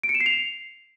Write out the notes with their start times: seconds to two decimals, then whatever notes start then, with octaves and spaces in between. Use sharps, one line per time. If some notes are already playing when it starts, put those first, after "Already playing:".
0.03 D7
0.09 C#7
0.15 E7
0.20 C7
0.26 F7